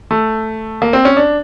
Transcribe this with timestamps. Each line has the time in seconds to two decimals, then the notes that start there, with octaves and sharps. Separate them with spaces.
0.11 A3
0.82 A#3
0.93 C4
1.05 C#4
1.17 D4